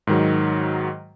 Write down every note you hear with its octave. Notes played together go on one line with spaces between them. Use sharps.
G#2 D#3 F#3